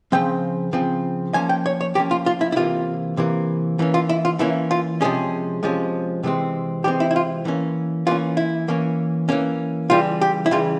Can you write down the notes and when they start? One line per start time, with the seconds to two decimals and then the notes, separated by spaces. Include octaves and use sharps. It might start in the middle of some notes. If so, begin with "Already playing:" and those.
0.12 C#3 F3 C4 G5
0.73 C#3 F3 C4
1.34 F3 A#3 C#4 G#5
1.49 G5
1.66 C#5
1.81 C#5
1.95 F3 A#3 C#4 G4
2.11 F4
2.26 F4
2.41 E4
2.52 E4
2.56 C3 E3 A#3 F4
3.17 C3 E3 A#3
3.79 E3 A#3 C#4
3.94 F4
4.09 E4
4.25 F4
4.39 E3 A#3 C#4 E4
4.71 F4
5.01 C3 F3 G#3 C#4 G#4
5.63 C3 F3 G#3 C#4
6.23 C3 E3 G#3 C4
6.84 C3 E3 G#3 C4 G4
7.00 E4
7.11 E4
7.16 F4
7.45 E3 A#3 C#4
8.07 E3 A#3 C#4 F4
8.37 E4
8.68 E3 A#3 C#4
9.29 E3 A#3 C#4
9.90 C#3 E3 G3 F4
10.21 G4
10.46 E4
10.51 C#3 E3 G3 F4